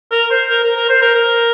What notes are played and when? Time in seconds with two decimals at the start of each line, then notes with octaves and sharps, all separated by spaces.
0.11 A#4
0.30 C5
0.49 A#4
0.63 A#4
0.76 A#4
0.89 C5
1.01 A#4
1.15 A#4